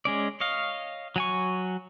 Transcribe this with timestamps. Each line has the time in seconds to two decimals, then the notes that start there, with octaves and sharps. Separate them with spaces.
0.05 G#3 C#4 D5
0.40 C#5 D#5 F5
1.16 F#3 G#5 C#6